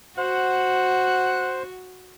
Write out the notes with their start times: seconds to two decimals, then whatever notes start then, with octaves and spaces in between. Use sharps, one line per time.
0.18 F#4 C5 F#5